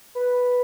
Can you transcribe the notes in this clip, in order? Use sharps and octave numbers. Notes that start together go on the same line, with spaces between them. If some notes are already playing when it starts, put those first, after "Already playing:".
B4